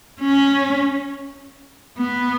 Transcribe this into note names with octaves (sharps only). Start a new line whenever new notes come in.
C#4
B3